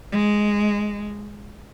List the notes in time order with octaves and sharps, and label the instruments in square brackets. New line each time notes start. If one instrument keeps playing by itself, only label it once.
[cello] G#3